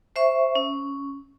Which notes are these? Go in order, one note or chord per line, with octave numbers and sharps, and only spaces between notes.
C5 E5 C#6
C#4